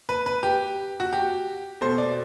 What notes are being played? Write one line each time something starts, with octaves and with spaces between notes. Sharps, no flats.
B4
B4
G4
F#4
G4
B2 A3 C5
D5